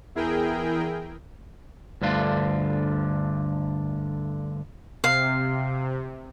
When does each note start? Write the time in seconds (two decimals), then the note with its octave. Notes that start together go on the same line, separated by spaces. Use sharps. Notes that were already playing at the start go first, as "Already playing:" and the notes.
0.15 E2 E4 G#4 A#4 G5
2.02 D2 G2 D3 D4 F4
5.04 C3 F5